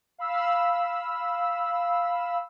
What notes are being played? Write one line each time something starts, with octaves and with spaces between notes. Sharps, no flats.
F5 B5 E6